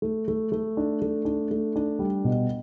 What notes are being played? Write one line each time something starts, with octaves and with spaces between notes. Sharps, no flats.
A3
A3
A3
D4
A3
D4
A3
D4
G3
B2